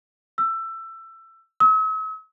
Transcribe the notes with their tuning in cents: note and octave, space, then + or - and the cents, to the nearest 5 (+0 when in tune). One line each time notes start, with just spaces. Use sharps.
E6 +20
E6 -45